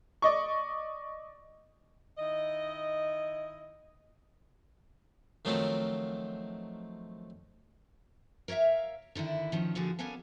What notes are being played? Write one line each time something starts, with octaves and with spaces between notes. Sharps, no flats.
D5 D#5 C#6
D#3 E4 D#5
D#3 F3 F#3 A3 C4
A#4 C#5 D5 E5 F5
D3 D#3 D4 E4
D#3 F3 C#4
A#2 D3 F3 F#4 G#4
A#3 B3 C#4 A4 F5 G#5